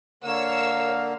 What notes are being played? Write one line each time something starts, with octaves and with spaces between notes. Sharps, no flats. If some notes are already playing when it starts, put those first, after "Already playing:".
D3 A#3 A#4 C#5 F5 E6